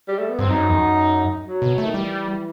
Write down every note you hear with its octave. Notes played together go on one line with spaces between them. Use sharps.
G3
A3
B3
G2 C4
F#2 D#4
E2
F#2
F#3
B2
D#3 A3
E3 G3